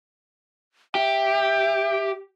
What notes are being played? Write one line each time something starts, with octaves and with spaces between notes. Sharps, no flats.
G4 E5